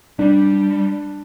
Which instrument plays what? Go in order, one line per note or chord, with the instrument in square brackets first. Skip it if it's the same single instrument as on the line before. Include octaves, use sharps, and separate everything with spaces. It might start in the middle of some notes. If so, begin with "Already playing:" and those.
[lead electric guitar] G3 [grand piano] D4